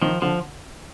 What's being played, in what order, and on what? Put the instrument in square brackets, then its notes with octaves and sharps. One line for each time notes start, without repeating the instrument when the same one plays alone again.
[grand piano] D#3 [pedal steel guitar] F3
[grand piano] D3 [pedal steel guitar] F3